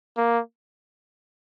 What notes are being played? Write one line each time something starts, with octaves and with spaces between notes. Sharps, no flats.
A#3